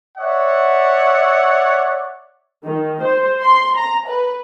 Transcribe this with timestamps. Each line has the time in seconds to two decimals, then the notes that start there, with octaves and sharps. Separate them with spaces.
0.18 C#5 D5 E5 F#5
2.64 D#3
3.02 C5
3.42 C6
3.77 A#5
4.09 B4